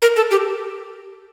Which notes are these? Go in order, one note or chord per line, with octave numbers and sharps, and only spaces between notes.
A#4
A4
G4